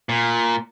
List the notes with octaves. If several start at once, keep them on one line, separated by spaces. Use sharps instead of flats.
A#2